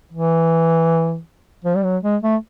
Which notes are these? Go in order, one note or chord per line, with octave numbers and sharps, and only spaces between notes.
E3
F3
G3
F#3
G#3
A3